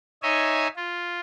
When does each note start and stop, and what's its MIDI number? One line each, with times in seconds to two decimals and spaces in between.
0.23 0.68 63
0.23 0.68 73
0.23 0.68 75
0.23 0.68 76
0.23 0.68 80
0.76 1.20 65